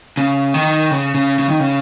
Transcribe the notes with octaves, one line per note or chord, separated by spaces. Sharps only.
C#3
D#3
C#3
C#3
C#3
D#3
C#3